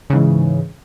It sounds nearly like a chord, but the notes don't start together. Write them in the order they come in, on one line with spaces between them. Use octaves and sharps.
C#3 G#2 E3